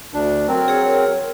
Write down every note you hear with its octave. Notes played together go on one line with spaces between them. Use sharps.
D2 D4
F#3 C4 A#4
G#4 C#5